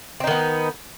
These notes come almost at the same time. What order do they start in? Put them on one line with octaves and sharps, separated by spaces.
C4 D#4 D#3 B3